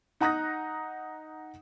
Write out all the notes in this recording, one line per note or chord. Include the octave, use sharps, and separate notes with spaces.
D#4 F#5 A#5 D#6 F#6 A#6